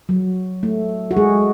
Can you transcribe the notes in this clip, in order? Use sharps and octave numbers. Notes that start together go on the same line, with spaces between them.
F#3
A3
F#4
G#3 G#4